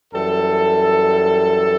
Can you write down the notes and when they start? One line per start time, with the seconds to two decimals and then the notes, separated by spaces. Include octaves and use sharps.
0.13 F#2 E3 G3 A4